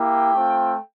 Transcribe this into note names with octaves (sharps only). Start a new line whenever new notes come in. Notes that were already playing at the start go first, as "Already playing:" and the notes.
Already playing: A#3 E4 G4 G5
A3 C4 F4